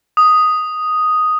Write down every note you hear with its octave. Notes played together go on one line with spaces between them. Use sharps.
D#6